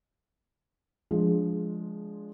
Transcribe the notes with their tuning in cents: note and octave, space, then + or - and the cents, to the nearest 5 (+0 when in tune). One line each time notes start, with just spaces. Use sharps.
F3 +0 G#3 +5 D4 -15